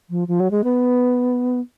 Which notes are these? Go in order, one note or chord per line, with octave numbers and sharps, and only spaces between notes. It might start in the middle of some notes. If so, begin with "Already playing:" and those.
F3
F3
F#3
G#3
B3